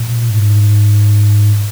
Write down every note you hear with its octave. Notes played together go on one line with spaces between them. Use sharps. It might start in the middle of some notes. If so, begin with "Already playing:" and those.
Already playing: A#2
G#2